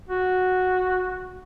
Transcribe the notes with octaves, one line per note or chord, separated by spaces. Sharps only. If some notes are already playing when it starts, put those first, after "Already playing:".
F#4